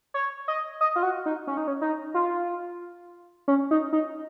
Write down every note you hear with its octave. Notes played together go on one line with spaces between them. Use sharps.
C#5
D#5
D#5
F4
F#4
D#4
C#4
D#4
C#4
D#4
F4
C#4
D#4
D#4